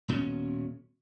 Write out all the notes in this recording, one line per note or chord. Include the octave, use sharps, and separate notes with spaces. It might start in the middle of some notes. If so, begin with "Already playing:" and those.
D#1 B2 C4 C#4